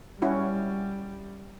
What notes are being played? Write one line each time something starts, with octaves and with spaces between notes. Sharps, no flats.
G3 C#4 E4 F#4